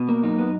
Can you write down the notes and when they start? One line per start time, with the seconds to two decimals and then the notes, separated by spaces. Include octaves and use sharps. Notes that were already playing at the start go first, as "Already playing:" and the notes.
Already playing: B2
0.09 A#3
0.23 F#2 D#4
0.38 B3